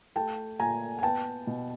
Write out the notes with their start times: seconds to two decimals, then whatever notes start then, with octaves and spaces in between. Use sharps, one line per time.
0.16 A3 G5 A5
0.60 A#2 G#5 A#5
0.99 G#5
1.03 B3 G5 A5
1.47 B2